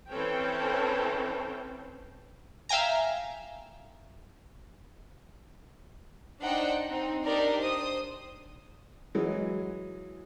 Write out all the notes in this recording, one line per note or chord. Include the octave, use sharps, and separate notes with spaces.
E3 C4 C#4 A4 C5 G5
E5 F5 G5 G#5 A#5
D4 D#4 C5 F#5 G5
C4 D#4
D4 D#4 G4 A#4 D5
C5 D#6
E3 F#3 G#3